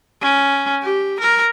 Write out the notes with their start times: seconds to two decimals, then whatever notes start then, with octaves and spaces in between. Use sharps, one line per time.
0.22 C#4
0.82 G4
1.20 A#4